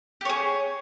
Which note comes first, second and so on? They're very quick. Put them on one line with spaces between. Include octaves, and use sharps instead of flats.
G4 C#5 G#4